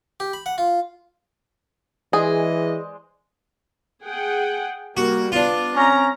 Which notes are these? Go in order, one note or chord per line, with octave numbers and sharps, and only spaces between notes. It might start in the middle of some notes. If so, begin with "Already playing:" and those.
G4
B5
F#5
F4
E3 G#3 G#4 C5 D5 D#5
G#4 F#5 G5
G3 A#3 F#4
B3 D4 F4
C4 C#4 A#5